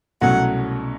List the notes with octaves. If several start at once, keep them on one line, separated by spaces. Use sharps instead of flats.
C2 B2 F#3 A3 C#4 F#5